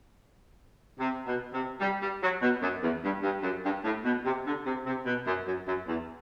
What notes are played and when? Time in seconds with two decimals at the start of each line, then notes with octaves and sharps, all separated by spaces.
0.99 C3
1.26 B2
1.53 C3
1.80 G3
2.01 G3
2.21 F#3
2.42 B2
2.62 F#2
2.82 E2
3.03 G2
3.23 G2
3.43 F#2
3.64 G2
3.84 A2
4.05 B2
4.25 C3
4.46 D3
4.65 C3
4.86 C3
5.06 B2
5.26 F#2
5.46 F#2
5.67 F#2
5.88 E2